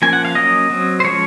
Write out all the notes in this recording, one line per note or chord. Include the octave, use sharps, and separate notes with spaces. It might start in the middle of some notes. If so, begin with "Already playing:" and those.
F3 A#3 C#4 G#5
F#5
F5
F#3 A#3 C#4 D#5
F#3 C4
C5
F3 G#3 C#4 C#5